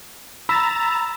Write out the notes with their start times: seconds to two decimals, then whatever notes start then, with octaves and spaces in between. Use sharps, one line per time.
0.49 A#5 B5 E6 A6 B6 E7